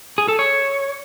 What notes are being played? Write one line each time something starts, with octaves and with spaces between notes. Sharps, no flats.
G#4
A4
C#5